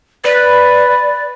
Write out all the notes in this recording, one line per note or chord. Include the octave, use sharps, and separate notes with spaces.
B4 D5